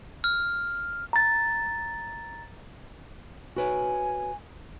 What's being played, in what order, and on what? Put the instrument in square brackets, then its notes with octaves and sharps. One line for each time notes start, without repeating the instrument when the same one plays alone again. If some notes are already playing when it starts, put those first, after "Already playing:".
[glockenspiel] F6
[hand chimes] A#5 A6
[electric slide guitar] F#4 B4 C#5 [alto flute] G#5